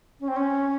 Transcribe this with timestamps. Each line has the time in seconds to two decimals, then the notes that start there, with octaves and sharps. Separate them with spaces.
0.20 C#4
0.28 C4
0.36 C#4